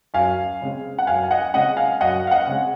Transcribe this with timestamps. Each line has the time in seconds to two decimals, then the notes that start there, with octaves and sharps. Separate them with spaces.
0.14 F#2 F5 G#5
0.61 C#3 G#3 C4
0.99 F#5
1.07 F#2 F5 G#5
1.24 G#5
1.31 D#5 F#5
1.53 C#3 G#3 C4 D#5 F#5
1.77 F5 G#5
2.01 F#2 D#5 F#5
2.27 F5
2.31 D#5 F#5
2.47 C#3 G#3 C4